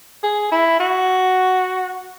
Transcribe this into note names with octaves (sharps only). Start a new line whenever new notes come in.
G#4
E4
F#4